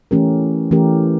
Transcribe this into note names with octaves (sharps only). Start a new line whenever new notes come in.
E3 A3 C#4 G4 A#4
E3 A3 C#4 G4 A#4